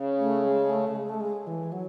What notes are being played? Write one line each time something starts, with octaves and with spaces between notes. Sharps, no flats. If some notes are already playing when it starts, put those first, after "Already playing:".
Already playing: C#3
A3
G#3
A3
G#3
A3
G#3
E3
F#3